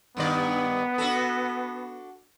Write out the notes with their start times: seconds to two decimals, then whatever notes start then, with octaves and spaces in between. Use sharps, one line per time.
0.17 G2 D#3 B3 D5
0.98 D4 F#4 A4